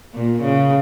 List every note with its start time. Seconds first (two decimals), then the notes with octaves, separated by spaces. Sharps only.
0.14 A#2
0.42 C#3